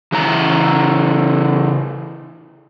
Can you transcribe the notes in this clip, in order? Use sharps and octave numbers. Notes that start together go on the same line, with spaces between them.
C#3 E3 A#5